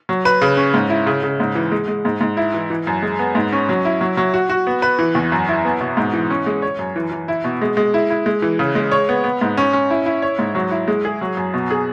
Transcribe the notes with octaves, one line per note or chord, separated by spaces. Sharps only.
F#3
B4
C#3
C#4
G#2
E4
C#3
C#3
G#2
E3
G#3
G#3
G#2
G#2
E4
E3
E3
F#2
G#3
B3
G#2
C#4
F#3
E4
F#3
F#3
F#4
F#4
B3
B4
E3
E2
F#2
E4
B3
B2
G#2
E3
C#4
G#3
C#5
F#2
E3
E3
E4
B2
G#3
G#3
E4
E4
G#3
E3
C#3
G#3
C#5
B3
B3
G#2
C#4
C#4
E4
E4
C#5
G#2
F#3
E4
G#3
G#4
F#3
F#2
B2
G#4